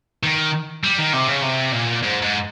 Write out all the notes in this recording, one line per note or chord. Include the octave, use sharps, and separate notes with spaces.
D#3
G3
D#3
C3
C#3
C3
A#2
G#2
G#2